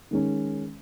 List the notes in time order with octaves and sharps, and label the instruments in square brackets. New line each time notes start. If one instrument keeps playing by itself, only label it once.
[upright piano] D#3 G#3 C#4